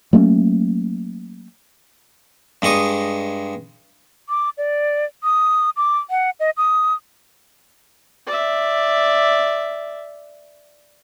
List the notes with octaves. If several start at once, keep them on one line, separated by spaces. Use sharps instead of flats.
F#3 A3 A#3 C#4
G2 G#3 D#5 C#6 D#6
D6
D5
D#6
D6
F#5
D#5
D#6
D5 E5